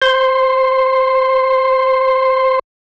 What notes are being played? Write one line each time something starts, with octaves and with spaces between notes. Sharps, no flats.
C5 C6